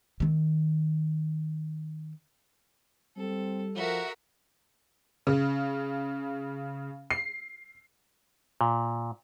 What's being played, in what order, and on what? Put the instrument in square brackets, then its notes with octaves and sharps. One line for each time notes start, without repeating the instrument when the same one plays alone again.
[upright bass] D#3 C4
[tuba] G3 [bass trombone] C4 [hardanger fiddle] A4
[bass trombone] F3 [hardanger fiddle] F#4 [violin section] A#4 E5 F#5
[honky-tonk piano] C#3
C7
[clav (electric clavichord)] A#2